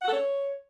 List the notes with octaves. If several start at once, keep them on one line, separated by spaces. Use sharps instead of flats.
F#5
A4
C#5